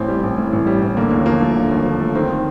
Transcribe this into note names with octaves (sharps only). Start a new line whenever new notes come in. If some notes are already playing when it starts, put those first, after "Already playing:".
Already playing: A1 A2 C4
G3
A1
A2
A1
G3
A1
D3 A#3
D#2
F3 A#3
A3
D3
D#2
F3
A3
D#3 C4